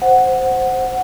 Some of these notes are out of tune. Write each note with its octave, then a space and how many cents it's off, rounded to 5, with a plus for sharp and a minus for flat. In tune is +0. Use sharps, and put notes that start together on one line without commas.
C5 +0 F#5 +0